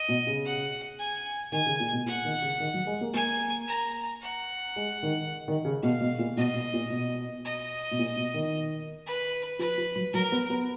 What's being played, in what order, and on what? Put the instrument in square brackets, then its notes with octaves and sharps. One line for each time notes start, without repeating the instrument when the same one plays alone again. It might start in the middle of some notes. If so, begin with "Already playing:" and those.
Already playing: [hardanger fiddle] D#5
[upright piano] B2
C#3
[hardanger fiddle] F#5
G#5
[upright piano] D#3 [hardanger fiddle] G#5
[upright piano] C#3
A#2
B2
[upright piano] A#2 [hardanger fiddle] F#5
[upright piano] D#3
C#3
D#3
F#3
G#3
A#3
[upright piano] A#3 [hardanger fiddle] G#5
[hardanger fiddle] A#5
F#5
[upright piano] G#3
D#3
D#3
C#3
[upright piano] B2 [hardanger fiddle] F5
[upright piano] B2
A#2
[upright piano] B2 [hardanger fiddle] D#5
[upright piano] B2
A#2
B2
[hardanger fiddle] D#5
[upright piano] B2
A#2
B2
D#3
[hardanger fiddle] B4
[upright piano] F3 [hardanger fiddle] B4
[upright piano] F3
F#3
[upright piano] F#3 [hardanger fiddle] A#4
[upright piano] B3
B3